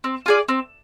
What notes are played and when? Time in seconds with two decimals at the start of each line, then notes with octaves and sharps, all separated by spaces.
0.04 C4
0.26 F4 G#4 D5
0.48 C4